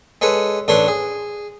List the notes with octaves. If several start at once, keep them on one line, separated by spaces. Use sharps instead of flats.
G#3 A4 B4 C#5 C#6
A1 D4 A4 B4 C#5 C6
G#4